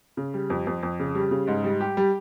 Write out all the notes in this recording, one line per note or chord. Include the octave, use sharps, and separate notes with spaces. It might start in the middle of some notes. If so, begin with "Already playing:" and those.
C#3
G3
F2
F2
F2
C#3
G3
C#3
G#2
G3
G4
G3